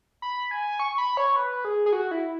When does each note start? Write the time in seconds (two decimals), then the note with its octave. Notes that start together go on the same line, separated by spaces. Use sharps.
0.22 B5
0.51 G#5
0.80 C#6
0.98 B5
1.17 C#5
1.36 B4
1.65 G#4
1.86 G#4
1.93 F#4
2.11 E4